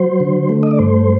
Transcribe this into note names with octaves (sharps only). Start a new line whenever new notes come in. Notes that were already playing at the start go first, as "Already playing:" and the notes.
Already playing: F#3 C5
D3
A3
D#5
D5
G2 C5